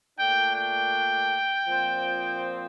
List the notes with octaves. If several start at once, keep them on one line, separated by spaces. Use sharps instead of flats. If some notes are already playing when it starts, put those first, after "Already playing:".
A#2 A3 D4 G5
G5
A#2 F3 C4